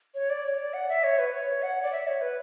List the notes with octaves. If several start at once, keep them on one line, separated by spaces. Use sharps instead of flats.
C#5
D5
C#5
D5
F#5
E5
C#5
B4
C#5
F#5
D5
E5
C#5
B4